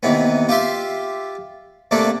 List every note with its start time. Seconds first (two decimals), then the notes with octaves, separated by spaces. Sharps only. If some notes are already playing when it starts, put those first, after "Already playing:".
0.03 D#2 C3 E3 B3
0.49 F4 G4 E5 C6
1.91 C3 A3 A#3 D4 A4